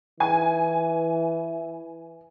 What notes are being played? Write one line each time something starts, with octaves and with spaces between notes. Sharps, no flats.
E3 G#5